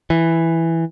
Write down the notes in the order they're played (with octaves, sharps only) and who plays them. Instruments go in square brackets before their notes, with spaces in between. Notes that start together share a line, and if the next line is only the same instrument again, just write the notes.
[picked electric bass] E3